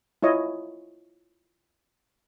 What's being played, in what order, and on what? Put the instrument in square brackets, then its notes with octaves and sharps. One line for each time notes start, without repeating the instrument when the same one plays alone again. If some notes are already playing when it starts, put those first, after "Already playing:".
[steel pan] E4 F4 C#5 D#5